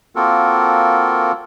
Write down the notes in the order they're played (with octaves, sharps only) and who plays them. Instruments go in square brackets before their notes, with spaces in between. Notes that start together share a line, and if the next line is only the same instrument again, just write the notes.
[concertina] A#3 C4 F4 F#4 A4 A#4